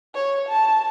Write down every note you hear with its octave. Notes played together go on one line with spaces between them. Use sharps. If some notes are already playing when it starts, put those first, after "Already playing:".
C#5
A5